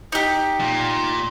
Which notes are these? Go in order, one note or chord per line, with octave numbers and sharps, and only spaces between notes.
D#4 G4
A#2